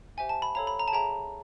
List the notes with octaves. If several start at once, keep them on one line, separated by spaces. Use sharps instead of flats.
G4 C5 E5 G5 G#5
A5
B5
A4 C#5 F5 A#5
B5
A#5
A5
G#4 C#5 E5 G5 A#5